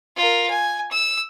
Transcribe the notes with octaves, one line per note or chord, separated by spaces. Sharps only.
F4 A#4
G#5
E6